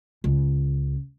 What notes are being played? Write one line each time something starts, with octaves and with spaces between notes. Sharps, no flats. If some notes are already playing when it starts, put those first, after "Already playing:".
C#2